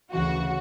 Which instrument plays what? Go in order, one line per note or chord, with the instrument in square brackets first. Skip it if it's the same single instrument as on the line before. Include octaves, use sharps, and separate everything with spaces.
[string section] D2 C#3 E3 F#4